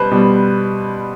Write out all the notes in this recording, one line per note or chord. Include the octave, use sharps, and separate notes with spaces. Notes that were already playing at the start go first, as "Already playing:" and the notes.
Already playing: B2 G3 B4 C5
B2 G3